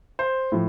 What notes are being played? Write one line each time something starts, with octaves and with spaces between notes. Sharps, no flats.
C5
A2 F3